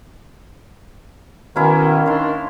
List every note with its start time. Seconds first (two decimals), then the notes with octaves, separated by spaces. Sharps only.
1.56 B2 D#3 A#3 C#4 E4
2.06 D#3 D4 C#5 C6